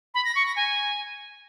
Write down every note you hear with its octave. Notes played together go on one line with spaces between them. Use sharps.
B5
A#6
C#6
A#6
G#5